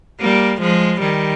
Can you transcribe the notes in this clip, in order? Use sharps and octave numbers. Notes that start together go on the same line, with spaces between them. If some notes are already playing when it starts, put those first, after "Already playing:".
G3 A#3
F3 G#3
D#3 G3